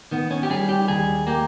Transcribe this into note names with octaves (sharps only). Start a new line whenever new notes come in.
D#3 B3
C#4
G4
G3 G#4
G4
D#2 G#4
A#3 G4